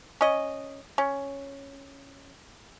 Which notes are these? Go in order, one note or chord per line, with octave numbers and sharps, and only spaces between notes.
C#4 D#5
C#4